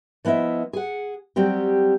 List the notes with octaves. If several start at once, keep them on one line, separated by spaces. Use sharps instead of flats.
F3 B3 E4 D#5 E5
G#4 F#5
F#3 G3 C4 G4